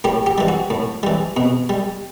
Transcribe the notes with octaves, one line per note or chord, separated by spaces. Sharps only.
A2 G4
G4
E3 G3
F#4
A2
E3 G3
B2
G3